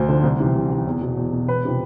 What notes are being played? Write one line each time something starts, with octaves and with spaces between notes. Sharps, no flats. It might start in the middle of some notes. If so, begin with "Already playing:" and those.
Already playing: D2 C5
D3 F3
C2
C3 E3
C2
C3 E3
E2
B2
E2
B2
E1 B4
C3 F3